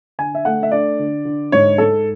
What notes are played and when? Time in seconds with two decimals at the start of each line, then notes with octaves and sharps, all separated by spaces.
0.19 D3 G#5
0.35 E5
0.45 A3 F#5
0.63 E5
0.72 D4 D5
0.99 D3
1.25 D3
1.52 G#2 C#5
1.78 G#2 A4